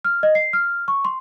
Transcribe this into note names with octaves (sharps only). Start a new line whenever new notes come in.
F6
D#5
C7
F6
C#6
C6